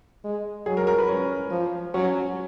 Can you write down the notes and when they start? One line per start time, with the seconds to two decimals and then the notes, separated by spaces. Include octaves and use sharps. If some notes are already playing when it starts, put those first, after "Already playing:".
0.24 G#3
0.66 F#3 G#4
0.77 A#4
0.87 A#4
0.98 B4
1.09 C#4
1.51 F3
1.94 F#3 C#4